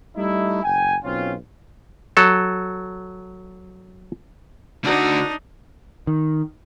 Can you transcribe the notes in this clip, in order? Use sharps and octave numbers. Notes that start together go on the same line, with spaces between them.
G3 A3 D#4 E4
F#1 G5 G#5
B1 C4 C#4 F4
F#3 A4
D3 D4 D#4 F#4
D#3